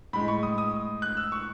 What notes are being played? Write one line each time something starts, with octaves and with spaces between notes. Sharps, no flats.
A2 G#3 B5
C#6
D#6
D#6
F#6
E6
C#6